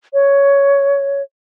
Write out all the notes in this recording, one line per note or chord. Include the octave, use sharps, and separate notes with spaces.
C#5